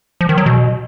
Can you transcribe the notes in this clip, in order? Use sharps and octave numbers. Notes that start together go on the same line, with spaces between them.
F3
D#3
F#3
B2